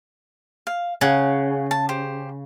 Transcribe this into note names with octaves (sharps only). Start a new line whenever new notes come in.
F5
C#3 G#4 F#5
A5
G4 C5